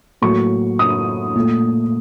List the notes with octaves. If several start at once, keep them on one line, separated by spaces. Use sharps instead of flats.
A2 F#3 A#3 C#6
D#6
A#2 A3